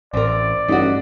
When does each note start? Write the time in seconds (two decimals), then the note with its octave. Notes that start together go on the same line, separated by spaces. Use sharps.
0.14 A1 C4 A#4 D5
0.69 A1 G2 D#4 F#4